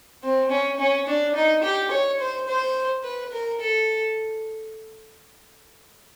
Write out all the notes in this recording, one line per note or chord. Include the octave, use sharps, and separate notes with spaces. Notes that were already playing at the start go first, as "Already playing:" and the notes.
C4
C#4
C#4
D4
D#4
G4
C#5
C5
C5
B4
A#4
A4